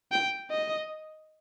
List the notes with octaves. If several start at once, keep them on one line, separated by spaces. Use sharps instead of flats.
G5
D#5